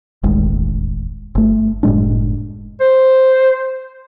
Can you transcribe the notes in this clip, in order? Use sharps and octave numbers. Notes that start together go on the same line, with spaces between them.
E1 A1 D#2 G#3
G1 A3
F#1 A2 G#3 D4
C5